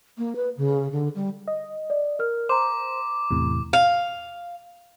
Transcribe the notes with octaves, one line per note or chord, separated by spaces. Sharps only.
A#3
B4
C#3
D3
G3
D#5
D5
A#4 F6
C5 A#5 C6 D6
E2 A2 C3
F5